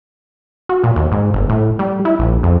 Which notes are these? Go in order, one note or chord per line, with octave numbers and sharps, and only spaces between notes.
F#4
A#2
D#2
G#2
G1
A2
G3
E4
A#1
F2